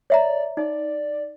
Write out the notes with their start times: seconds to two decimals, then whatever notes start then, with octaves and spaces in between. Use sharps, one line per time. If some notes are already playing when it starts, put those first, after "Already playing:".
0.10 C#5 D5 E5 A#5
0.57 D#4 D5